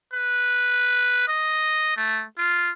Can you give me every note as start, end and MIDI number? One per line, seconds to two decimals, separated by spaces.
0.13 1.25 71
1.28 1.93 75
1.97 2.24 57
2.38 2.72 65